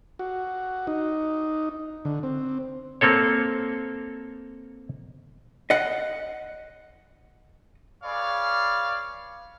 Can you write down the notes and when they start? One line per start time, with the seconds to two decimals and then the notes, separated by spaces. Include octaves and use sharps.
0.19 F#4
0.87 D#4
2.05 D3
2.23 C4
3.01 A#3 C4 A4 C#5
5.70 D#5 F#5
8.04 G#4 B4 C#5 D5 F5